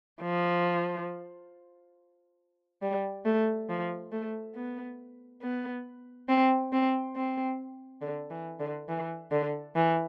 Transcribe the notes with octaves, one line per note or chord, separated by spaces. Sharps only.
F3
G3
A3
F3
A3
B3
B3
C4
C4
C4
D3
E3
D3
E3
D3
E3